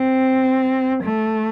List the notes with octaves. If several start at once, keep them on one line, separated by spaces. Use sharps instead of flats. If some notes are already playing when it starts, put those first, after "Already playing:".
Already playing: C4
A3